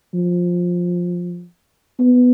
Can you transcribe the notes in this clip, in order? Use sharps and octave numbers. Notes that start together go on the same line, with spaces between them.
F3
B3